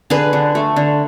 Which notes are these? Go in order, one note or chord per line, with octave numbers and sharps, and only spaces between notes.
D3 G#4 B4
D3
A3
D3